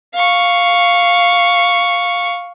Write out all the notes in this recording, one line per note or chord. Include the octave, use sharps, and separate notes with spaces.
F5 C#6